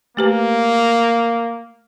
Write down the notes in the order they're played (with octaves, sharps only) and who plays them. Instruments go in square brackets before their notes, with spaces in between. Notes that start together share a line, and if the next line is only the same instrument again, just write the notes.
[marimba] A3 G4 B4 [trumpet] A#3